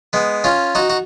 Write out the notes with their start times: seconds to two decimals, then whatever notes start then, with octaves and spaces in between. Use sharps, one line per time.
0.13 G#3 B3
0.44 C#4 F4
0.75 D#4 F#4
0.90 F#4